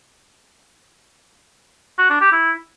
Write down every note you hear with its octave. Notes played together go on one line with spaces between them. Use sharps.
F#4
D4
G4
E4